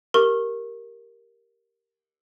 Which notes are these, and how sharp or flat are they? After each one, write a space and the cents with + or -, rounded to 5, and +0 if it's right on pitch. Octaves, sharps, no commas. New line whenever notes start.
G4 +0 A#4 +0 C#6 -25